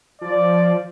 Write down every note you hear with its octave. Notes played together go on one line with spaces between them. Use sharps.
F3 D5